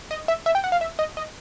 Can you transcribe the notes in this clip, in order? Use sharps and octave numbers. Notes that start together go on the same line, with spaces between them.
D#5
E5
E5
G5
F#5
F5
E5
D#5
D#5